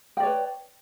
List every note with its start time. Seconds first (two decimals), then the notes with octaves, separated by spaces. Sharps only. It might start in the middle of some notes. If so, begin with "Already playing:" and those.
0.17 G5
0.20 D5
0.23 C#5
0.26 B4